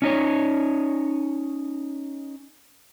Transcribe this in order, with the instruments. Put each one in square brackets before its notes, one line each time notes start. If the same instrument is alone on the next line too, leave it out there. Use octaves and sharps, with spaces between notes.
[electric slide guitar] C#4 D#4 C#5